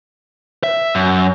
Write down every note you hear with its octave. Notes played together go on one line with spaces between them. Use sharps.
E5
F#2